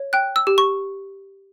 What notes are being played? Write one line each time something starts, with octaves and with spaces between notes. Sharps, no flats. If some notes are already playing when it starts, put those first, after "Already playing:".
Already playing: C#5
G5 F#6
E6
G4
C#6